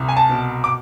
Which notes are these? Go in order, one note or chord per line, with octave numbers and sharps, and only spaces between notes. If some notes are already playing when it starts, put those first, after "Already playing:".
Already playing: C2
G#5
A5
B2
D6